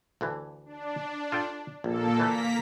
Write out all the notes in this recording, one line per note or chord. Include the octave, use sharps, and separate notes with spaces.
D2 D3 E3
D4
F4 A4 G5
A#1 A#2 A#3 A4
D2 E3 A3 A#3 A#5 B6